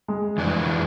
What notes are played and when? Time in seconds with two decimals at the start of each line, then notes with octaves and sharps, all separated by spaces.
0.08 G#3
0.38 F2 E3 D4